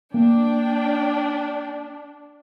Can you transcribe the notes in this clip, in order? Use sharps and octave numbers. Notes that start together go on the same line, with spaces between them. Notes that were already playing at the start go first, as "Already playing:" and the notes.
A#3 D4 G5